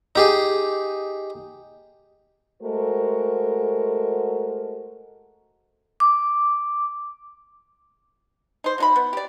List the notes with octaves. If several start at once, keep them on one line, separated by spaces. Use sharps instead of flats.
D#4 G4 G#4
G#3 A3 F#4 A4 A#4 C5
D6
D#4 C5
F#3 D#4 B5
B3
G4 D5